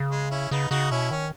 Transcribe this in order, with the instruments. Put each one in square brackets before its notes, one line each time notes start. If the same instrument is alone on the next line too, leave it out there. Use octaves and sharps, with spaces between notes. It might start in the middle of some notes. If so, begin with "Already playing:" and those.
Already playing: [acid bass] C#3
[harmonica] G#3
C#4 E4
[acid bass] C#3 [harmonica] B3 D#4
[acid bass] C#3 [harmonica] D#4 F#4
[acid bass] B2 [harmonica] C#4 E4
[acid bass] D#3 [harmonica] C#4